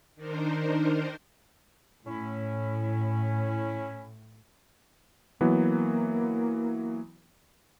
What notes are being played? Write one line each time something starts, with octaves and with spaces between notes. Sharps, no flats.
D#3 D4 D#4 A#4 C5
A2 C#4 E4
E3 F#3 A#3 B3